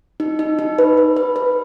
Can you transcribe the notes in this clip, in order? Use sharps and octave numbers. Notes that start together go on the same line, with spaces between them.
D#4
D#4
D#4
B4
B4
B4
B4